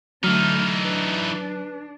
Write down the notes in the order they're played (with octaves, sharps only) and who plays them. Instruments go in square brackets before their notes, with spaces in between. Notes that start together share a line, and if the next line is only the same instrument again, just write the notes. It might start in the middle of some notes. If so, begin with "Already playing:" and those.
[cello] D3 A3 [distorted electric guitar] E3 D#4 [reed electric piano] F#3 [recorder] F6
[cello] D4 [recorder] B4